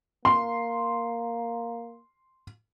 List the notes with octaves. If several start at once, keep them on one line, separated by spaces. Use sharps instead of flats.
A#3 C6